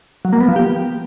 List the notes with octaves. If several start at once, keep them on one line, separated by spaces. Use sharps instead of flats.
F#3
A#3
B3
F3
G4